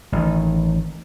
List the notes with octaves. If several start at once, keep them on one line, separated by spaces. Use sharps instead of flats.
A1 D#3